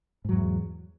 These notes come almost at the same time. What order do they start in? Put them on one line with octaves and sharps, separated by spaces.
G#2 F#3 E2